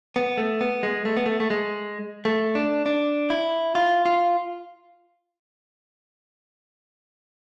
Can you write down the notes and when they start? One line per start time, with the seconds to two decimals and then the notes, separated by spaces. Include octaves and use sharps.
0.16 B3
0.38 A3
0.61 B3
0.83 G#3
1.05 A3
1.17 B3
1.26 A3
1.40 A3
1.50 G#3
2.25 A3
2.55 D4
2.86 D4
3.30 E4
3.75 F4
4.06 F4